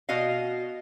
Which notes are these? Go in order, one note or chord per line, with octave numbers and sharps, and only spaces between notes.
B2 F#4 D#5 F5